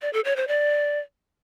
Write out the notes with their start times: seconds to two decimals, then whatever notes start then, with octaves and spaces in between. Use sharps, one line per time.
0.02 D5
0.13 A4
0.25 C#5
0.36 C5
0.48 D5